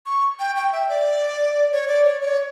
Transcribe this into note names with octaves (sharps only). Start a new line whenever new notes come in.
C#6
G5
G5
E5
D5
C#5
D5
C#5
C#5